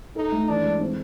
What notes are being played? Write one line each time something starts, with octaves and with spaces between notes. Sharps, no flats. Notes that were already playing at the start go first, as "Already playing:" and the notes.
D#4 A4
A3
E3 D4
G#3
C4